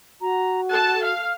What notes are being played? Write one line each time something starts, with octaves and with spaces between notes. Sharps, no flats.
F#4 A#5
A4 A5 F#6
F5 F6